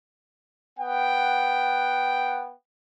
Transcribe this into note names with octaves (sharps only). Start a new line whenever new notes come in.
B3 F#5 G5